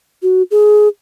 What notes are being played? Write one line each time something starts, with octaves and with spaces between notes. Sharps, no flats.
F#4
G#4